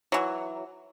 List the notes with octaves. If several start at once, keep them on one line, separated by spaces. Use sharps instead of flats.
E3 F#3